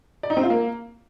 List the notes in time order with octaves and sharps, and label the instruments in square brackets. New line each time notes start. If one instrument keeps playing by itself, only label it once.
[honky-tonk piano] D5
D#4
C4
F4
A#3